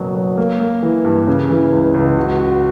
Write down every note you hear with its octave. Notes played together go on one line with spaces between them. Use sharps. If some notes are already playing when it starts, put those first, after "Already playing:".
Already playing: F#1 B2 F#3
F#3
A#3
A#3
E3
G2
C#3
E3
C#2
C#2
F#4
F#4